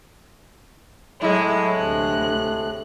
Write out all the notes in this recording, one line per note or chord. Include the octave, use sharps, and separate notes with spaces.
A2 F#3 G#3 E4
D2 C3 F#6